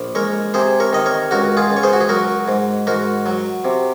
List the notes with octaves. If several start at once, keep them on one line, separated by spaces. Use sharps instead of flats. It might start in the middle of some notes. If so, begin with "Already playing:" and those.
Already playing: A#1
G#3 A#4 C#5
C3 G#4 C5
A#4 C#5
D#3 D#5
A#4 C#5
C#2 F#4 A#4
F4 G#4
C#2
C#5
G#4 C5
F#4
G#4
F#3 F#4 A#4
G#2
G#2 F#4 A#4
F#3
C3